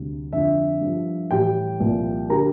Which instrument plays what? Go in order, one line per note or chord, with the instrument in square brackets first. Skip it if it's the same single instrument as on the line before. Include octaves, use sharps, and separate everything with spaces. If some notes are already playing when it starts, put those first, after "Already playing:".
Already playing: [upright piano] D2 C3 G3
F2 D3 F3 E5
G2 F3
A2 E3 G3 G4 G5
C2 A#2 F3
D3 G3 A#4 A#5